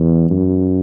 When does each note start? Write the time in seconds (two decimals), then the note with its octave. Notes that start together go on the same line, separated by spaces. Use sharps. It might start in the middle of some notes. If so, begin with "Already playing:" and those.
Already playing: E2
0.30 F#2